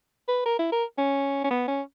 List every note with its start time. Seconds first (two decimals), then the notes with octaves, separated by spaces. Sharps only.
0.28 B4
0.46 A#4
0.59 E4
0.72 A#4
0.98 C#4
1.44 C#4
1.51 B3
1.68 C#4